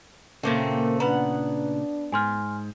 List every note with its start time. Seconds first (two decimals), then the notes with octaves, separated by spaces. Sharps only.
0.43 A#2 C#3 A3 A#3 C4
1.00 B3 D4 B4 F#5 A#5
2.12 G#2 G#5 C6 F6